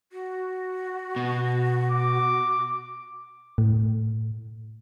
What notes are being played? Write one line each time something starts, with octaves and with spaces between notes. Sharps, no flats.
F#4
B2
D6
A2